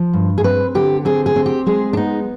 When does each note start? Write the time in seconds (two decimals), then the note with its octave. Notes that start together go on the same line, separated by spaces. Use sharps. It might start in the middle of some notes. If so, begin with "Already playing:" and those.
Already playing: F3
0.13 G2
0.38 G#4
0.44 C4 B4
0.75 D3 G4
1.05 C4 G#4
1.26 G#4
1.36 C4
1.46 G4
1.66 G#3 G#4
1.93 D4
1.97 B3 D#4